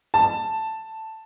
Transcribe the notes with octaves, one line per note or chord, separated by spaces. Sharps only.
A5